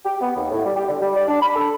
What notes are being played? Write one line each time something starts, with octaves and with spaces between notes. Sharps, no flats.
G4
B3
D#2
A2
G3
G4
D3
G3
D5
D4
B5
A4